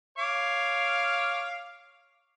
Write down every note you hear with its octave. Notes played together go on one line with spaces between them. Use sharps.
C#5 F5 D6